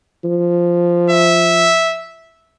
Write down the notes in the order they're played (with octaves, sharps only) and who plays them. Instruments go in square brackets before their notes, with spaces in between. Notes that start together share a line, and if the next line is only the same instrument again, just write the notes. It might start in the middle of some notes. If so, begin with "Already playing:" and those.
[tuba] F3
[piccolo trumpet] E5